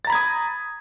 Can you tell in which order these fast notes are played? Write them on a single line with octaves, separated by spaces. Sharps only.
A6 A#5 B5 G#6 D#6